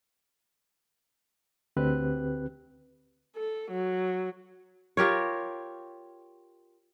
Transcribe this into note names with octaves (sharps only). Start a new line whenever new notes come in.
D2 D3 C4 G4 B4 F#6
A4
F#3
F4 G4 A#4 C#5